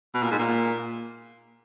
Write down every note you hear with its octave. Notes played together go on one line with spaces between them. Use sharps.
B2
A#2
G#2
A#2